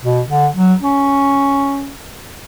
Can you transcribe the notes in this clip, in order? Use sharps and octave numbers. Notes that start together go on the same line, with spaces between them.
B2
D3
F#3
C#4